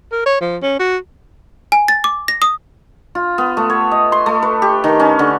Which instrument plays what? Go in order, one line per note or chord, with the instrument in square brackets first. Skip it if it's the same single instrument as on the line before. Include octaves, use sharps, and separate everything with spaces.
[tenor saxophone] A#4
C#5
F3
C#4
F#4
[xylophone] G#5
A6
D6
A#6
D#6
[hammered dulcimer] F4
B3
A3
C#5
D#5
C6
A3
B4
G4
D#3
C#4
D3